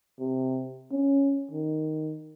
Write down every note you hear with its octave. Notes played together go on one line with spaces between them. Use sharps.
C3
C#4
D#3